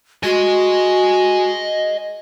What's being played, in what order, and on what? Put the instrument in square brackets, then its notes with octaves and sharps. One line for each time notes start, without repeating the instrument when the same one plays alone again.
[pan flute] F#4 [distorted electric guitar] D#5 G#5